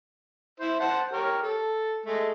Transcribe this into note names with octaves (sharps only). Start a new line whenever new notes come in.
E4 C5
C5 F#5 A5
G4 A#4 C#5
A4
G#3 A3